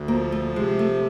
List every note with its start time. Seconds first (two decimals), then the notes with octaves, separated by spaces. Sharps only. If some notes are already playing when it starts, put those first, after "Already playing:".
Already playing: D2
0.08 F3 A#3
0.32 A3
0.56 C3 G#3
0.79 A3